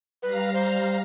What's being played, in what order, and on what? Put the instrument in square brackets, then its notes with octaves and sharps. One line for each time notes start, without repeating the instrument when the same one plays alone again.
[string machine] G3 F5 A#5 [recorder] B4
[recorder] C5